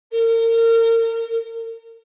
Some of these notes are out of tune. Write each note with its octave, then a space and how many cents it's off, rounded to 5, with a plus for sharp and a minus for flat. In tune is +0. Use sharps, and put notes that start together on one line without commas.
A#4 -35